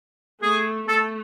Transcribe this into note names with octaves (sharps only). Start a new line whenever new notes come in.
A3 G#4
A3 A4